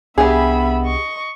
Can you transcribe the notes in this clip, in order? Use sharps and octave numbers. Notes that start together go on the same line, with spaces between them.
C2 B3 D4 G4 G#4 E5 B5
D#5 C#6